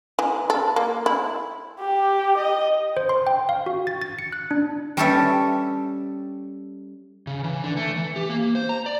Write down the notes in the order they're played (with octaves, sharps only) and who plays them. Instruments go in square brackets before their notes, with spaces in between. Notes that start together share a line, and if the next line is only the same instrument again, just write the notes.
[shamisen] E3
A4
A#3
E4
[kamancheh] G4
D#5
[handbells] C5
C6
G5
F5
F#4
A6
A6
C#7
F#6
D4
[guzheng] G3 C#4 G4 A4 C#5 E5
[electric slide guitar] C#3
E3
D3
A3
E3
G4
A#3
C5
A#5
D5